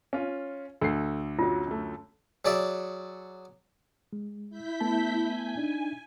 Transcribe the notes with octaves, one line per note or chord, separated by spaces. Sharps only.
C#4 F4
D2 A4 C7
F#2 F#3 F4
F#2 A3
F#3 G#4 D5 E5
G#3
E4 G6 B6
A3 B3 A5
G#5
D4 D#4